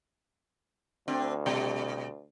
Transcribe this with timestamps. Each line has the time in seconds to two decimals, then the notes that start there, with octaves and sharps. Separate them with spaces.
1.08 D2 C4 D4
1.46 B2 G3